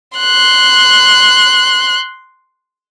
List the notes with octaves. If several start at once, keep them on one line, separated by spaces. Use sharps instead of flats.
C6 F#6